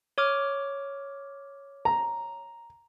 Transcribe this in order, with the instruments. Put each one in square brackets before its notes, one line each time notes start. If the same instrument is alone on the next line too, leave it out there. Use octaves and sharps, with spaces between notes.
[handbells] C#5 D6 F6
[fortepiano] A#5